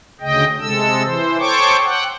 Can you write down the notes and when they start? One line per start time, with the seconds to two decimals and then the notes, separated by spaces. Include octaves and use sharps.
0.21 D2 C#3 D#5 G5
0.61 C3 G#3 A4 E6
1.03 E3 C5
1.39 A4 C5 C#5 G5 C#6 D6
1.84 F#5 G5